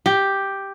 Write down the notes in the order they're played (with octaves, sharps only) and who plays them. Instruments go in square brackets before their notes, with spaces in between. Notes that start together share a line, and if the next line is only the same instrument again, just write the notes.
[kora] G4